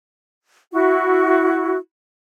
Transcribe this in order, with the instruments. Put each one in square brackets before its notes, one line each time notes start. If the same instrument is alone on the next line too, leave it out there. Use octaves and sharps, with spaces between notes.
[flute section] E4 F#4